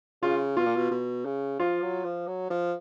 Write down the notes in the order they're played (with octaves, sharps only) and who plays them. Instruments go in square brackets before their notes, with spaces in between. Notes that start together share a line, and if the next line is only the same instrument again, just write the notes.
[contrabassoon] C#3 [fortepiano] F4
[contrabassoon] B2 [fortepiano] F4
[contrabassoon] A#2
B2
B2
C#3
[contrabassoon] F3 [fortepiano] F4
[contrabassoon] F#3
F3
F#3
F3